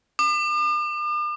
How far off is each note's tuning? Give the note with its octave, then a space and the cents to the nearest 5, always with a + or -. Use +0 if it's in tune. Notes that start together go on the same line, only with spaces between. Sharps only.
D6 +45